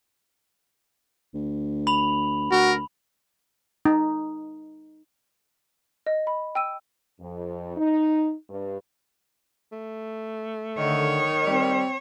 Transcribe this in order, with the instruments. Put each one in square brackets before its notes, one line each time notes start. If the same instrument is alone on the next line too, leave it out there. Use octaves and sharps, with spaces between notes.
[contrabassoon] D2
[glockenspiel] B5 F7 F#7
[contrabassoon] D2 [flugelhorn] F#4 [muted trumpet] A#4
[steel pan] D#4
[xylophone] D#5
B5
G5 E6 D#7
[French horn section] F2
D#4
G2
[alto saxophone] A3
[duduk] D3 [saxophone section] D#3 [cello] C#5
[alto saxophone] G3 [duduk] C4